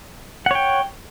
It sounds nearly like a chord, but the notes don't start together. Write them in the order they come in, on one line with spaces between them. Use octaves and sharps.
F#5 C#5 G5